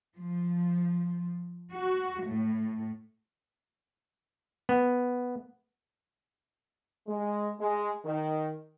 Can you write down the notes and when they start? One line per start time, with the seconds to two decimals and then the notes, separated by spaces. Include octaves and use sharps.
0.16 F3
1.72 F#4
2.24 A2
4.69 B3
7.07 G#3
7.59 G#3
8.04 D#3